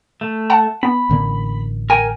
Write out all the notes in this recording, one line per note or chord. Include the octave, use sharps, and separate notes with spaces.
A3
F#5 A5
B3 B5
A1 D3 A#3
A#4 G5 G#5